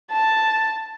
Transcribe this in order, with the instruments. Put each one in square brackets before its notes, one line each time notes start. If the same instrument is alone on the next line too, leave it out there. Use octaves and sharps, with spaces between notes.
[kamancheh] A5